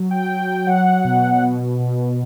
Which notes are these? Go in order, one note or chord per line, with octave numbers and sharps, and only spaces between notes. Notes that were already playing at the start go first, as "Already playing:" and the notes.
Already playing: F#3
G5
F#3 G5
G5
F#3 F#5
B2
B2
B2